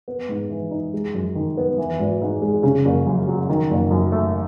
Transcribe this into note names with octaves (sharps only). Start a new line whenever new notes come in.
B3
G#2
E3
D#4
G#3
F#2
D#3
B3
E3
G#1
G#2
G#3
C#3
F#1
F#2
F#3
D#3
F#1
F#2
A3